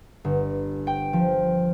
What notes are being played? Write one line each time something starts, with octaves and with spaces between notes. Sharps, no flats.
G1
G5
F3